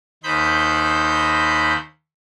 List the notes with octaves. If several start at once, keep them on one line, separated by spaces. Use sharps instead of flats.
D#2 D#4 C5 B5 G6